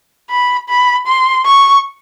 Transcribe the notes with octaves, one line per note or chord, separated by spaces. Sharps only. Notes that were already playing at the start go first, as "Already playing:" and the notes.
B5
B5
C6
C#6